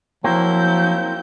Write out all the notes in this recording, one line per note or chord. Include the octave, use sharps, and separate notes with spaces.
F3 F#3 A#3 C4 E4 G6